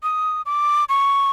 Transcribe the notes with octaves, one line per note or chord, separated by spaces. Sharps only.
D#6
D6
C#6